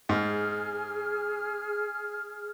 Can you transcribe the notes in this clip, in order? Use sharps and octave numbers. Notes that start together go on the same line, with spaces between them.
G#2 G#4 F6